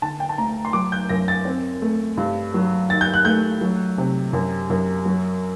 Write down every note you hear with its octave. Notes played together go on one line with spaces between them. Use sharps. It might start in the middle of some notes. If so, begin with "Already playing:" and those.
D3 A5
G5
A5
D2 A#5
C6
F#3 D6
G6
F#2 A#6
A6
C4
A3
G2
F#3
D#3 A6
G6
F#6
A3 G6
F#3
C3
F#2
F#2
F#3